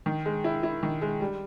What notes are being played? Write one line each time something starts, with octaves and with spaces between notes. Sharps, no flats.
D#3
G#3
E4
E4
D#3
G#3
G3